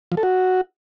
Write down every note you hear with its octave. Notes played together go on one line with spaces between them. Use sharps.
F3
A4
F#4